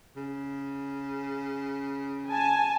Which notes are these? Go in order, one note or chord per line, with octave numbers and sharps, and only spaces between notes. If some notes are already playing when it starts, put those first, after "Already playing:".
C#3
G#5 A5